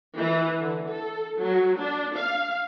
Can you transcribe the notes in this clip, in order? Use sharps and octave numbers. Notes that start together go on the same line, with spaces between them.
E3
D3
A4
F#3
D4
F5